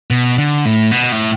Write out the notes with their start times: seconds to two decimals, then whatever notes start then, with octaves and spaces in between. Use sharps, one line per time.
0.10 B2
0.38 D3
0.65 A2
0.91 B2
1.12 A2